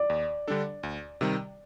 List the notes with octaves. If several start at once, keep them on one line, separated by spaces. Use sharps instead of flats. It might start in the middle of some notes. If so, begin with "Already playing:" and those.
Already playing: D5
D#2
D3 G3 D4 A4
D2
C3 D#3 G3